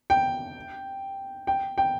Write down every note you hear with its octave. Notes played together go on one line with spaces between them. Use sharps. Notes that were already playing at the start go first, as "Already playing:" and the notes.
G5
G5
G5